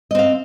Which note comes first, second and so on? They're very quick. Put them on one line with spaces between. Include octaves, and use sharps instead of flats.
D#5 C4 F5